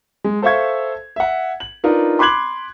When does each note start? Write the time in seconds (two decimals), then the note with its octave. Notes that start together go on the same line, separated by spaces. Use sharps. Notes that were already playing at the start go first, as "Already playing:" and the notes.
0.24 G#3
0.42 A4 C5 E5 F5 C#6 G#6
1.16 E5 F#5
1.60 F#7
1.84 D4 D#4 F4 A#4 B4
2.19 B5 C6 D6 F#6 G#6 F#7